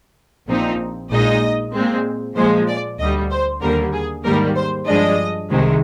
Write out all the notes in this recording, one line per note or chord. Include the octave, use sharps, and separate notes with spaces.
A#1 A#2 F3 C4 D#4
A#1 A#2 G#3 D#4 D#5
A#2 G#3 C4
A#2 F3 G#3 C5
D5
D2 D3 G3 D#5
C5
D#2 D3 G3 A#3 A#4
G#4
G#2 D#3 G3 A#3 A#4
C5
G2 F3 G#3 D4 D#5
C2 C3 D#3 G#3